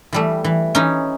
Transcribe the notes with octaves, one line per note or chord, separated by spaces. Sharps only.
E3 G3 A3
E3
E3 C#4 D#4